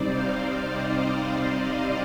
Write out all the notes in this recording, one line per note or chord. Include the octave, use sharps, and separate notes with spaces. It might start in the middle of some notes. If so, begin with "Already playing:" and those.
Already playing: C3 G3 C4 D#4 C5 D5
F5
F5
D#5
D5
D5